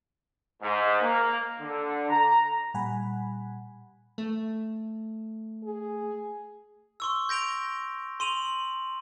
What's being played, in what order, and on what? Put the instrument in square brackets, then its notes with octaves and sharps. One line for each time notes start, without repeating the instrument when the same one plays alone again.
[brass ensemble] G#2
A#3
D3
A#5
[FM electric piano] A#2 G3 F#5 G#5 B5
[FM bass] A3
[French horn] G#4
[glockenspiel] C6 C#6 E6
G6 A#6 D7 F7 G7
C6 D#7 F7 F#7